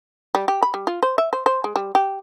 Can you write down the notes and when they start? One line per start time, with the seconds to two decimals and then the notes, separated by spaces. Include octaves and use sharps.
0.35 G3
0.48 G4
0.63 B5
0.74 G3
0.87 F4
1.03 C5
1.18 E5
1.33 C5
1.46 C5
1.64 G#3
1.76 G3
1.95 G4